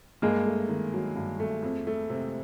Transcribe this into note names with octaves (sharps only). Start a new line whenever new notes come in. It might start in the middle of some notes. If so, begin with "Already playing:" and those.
G2 G#3 A#3
A3
D#3
F#3
G2
A3
F2
A3
C3